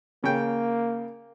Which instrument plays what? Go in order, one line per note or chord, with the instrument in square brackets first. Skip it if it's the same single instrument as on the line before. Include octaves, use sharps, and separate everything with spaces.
[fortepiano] C#3 G5 [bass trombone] A#3